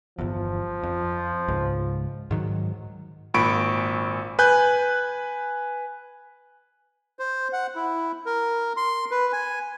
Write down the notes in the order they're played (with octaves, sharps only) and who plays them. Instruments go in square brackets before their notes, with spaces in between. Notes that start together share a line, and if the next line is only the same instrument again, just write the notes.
[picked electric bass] G1 E2 [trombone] F3
[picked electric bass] F2
C#2 G#2
G#2 D#3 F#3
[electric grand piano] G#1 A#2 B5 C#6 D7
B4 G#5 F#6 G6
[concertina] C5
F#5
E4
A#4
C6
B4
G#5